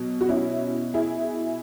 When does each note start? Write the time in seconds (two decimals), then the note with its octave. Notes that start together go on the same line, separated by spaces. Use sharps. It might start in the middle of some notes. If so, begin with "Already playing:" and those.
Already playing: B2 F#3
0.21 F#4
0.29 C#4 E4
0.94 E4 G#4